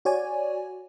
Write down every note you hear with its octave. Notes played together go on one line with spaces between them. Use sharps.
F#4 C#5 D5 G#5